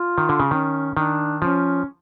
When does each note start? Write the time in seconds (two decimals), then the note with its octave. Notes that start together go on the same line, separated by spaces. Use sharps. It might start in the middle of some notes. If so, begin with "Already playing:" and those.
Already playing: F4
0.18 D#3
0.29 D3
0.40 C#3
0.51 D#3 C#4
0.96 D#3 D4
1.42 F3 C#4